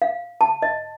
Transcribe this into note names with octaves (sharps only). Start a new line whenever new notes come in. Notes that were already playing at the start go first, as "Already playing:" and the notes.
F5
A5
D#5